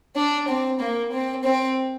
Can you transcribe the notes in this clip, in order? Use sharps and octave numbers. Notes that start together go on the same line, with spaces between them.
D4
C4
A#3
C4
C4